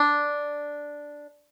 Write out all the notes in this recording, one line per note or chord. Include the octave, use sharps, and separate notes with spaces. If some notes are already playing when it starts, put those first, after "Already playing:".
Already playing: D4